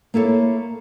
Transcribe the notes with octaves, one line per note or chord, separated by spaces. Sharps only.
A#3 E4 A4 C#5